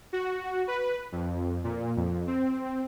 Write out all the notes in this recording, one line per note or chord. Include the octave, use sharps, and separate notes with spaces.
F#4
B4
F2
A#2
F2
C4